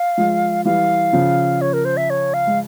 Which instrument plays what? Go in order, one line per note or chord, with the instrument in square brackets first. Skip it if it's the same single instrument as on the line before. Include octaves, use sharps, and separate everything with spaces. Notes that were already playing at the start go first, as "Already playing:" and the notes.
Already playing: [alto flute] F5
[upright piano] F3 G#3
[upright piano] E3 G3 [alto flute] F5
[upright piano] C#3 F3
[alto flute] C#5
A#4
C5
E5
C#5
F5
[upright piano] G#3